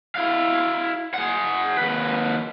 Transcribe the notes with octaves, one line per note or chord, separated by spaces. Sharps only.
E4 F5
G#4 F#5
D#2 B4